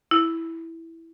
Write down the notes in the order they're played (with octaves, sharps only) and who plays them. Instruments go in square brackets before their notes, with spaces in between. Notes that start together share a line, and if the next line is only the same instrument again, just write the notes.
[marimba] E4